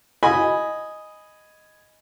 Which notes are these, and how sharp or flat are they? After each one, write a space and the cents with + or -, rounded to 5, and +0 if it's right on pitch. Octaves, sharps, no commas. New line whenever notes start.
D#5 +0 G#5 +0 B5 +0